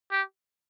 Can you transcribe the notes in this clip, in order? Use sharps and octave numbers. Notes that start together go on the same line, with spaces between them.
G4